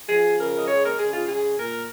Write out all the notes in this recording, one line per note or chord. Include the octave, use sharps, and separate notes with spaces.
F3 G#4
C#3 A#4
D#5
G#3 C#5
A#4
C#3 G#4
F4
G#3 G#4
A#2 A#4